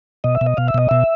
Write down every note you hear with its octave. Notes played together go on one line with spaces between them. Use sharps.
B2 D#5
E5
B2
D#5
B2 F5
E5
B2 D#5
B2 E5